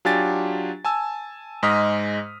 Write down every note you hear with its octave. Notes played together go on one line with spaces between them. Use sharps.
F#3 D4 F4 G4 G#5 A6
G#5 A5 E6
G#2 G#3 D#5 D#6 F6 B6